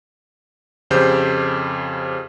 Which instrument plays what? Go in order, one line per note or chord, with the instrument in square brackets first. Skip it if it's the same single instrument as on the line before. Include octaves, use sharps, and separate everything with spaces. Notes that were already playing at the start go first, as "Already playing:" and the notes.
[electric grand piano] F2 C#3 G4 C5 G6